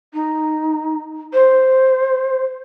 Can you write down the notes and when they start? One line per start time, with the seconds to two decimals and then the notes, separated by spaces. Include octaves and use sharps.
0.13 D#4
1.33 C5